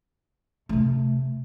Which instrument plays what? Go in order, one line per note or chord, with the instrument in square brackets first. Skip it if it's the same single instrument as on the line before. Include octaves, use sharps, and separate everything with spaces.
[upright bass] C3 A3